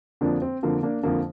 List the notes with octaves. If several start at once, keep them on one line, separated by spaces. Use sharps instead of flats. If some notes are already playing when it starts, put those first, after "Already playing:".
F2 D3 F3 A#3 D4
C4
F2 D3 F3 A#3
A#3 D4
F2 D3 F3 A#3